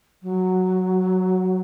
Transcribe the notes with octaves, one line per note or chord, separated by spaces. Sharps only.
F#3